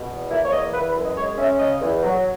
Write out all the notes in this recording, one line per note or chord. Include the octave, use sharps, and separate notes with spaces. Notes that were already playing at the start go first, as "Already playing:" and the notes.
Already playing: B2
E2
A#3 E4
C#5
E2 D#5
E3 B4
B4
F#2
D#5
G#3 C#5
C#4 E5
C#3 D#5
E2
F#3